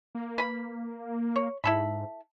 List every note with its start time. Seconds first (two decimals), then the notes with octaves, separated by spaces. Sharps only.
0.15 A#3
0.38 B4 B5
1.36 C#5
1.64 G#2 E4 A4 B5